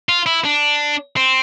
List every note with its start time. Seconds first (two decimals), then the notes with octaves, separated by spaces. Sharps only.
0.09 F4
0.26 E4
0.44 D4
1.17 C4